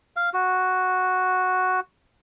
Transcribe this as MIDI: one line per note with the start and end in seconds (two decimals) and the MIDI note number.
0.16 0.30 77
0.34 1.80 66